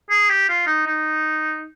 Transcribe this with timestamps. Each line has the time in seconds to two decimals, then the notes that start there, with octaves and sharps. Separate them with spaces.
0.10 G#4
0.30 G4
0.49 F4
0.67 D#4
0.86 D#4